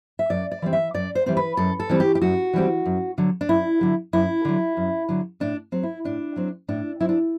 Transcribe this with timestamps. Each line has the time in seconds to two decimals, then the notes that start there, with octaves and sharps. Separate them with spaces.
0.19 E5
0.30 F#2 D5
0.52 D5
0.62 E3 G3 C4
0.73 E5
0.94 F#2 D5
1.15 C5
1.26 E3 G3 C4 C5
1.37 B4
1.57 F#2 A4
1.80 A4
1.89 E3 G3 C4
2.00 G4
2.15 G4
2.21 F#2 F#4
2.53 E3 G3 C4
2.86 F#2
3.18 D3 F#3
3.41 D4
3.49 F#2 E4
3.81 D3 F#3
4.13 F#2 E4
4.45 D3 F#3
4.77 F#2
5.09 D3 F#3
5.40 A2 D4
5.72 F#3 C4
5.83 E4
6.05 A2 D4
6.36 F#3 C4
6.68 A2 D4
7.00 F#3 C4 E4
7.09 D4